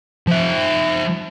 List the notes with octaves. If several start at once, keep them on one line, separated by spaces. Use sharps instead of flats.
F3 E5